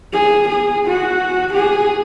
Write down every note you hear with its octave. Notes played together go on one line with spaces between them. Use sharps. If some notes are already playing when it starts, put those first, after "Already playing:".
G#4
G#4
F#4
G#4